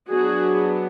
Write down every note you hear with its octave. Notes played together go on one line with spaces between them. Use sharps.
F#3 B3 D4 F#4 G#4